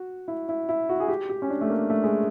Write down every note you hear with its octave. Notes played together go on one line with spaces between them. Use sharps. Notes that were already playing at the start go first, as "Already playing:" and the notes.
Already playing: F#4
E4
E4
E4
F#4
G#4
G4
G4
C#4
D4
A3
A#3
A3
G#3